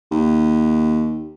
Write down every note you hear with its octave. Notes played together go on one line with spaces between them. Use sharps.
D#2